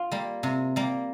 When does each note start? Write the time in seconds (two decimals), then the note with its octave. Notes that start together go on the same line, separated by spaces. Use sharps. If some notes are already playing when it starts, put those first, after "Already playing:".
Already playing: F4
0.12 G3 A#3
0.43 C3
0.76 G3 A#3